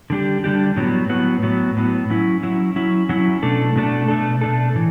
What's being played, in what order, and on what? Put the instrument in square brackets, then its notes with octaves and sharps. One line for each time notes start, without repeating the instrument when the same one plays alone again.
[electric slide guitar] D3 G3 D4 G4
D3 G3 D4 G4
A2 F#3 B3
A2 F#3 B3
A2 F#3 B3
A2 F#3 B3
F#3 C#4 E4
F#3 C#4 E4
F#3 C#4 E4
F#3 C#4 E4
B2 A3 D4 A4
B2 A3 D4 A4
B2 A3 D4 A4
B2 A3 D4 A4
A2 E3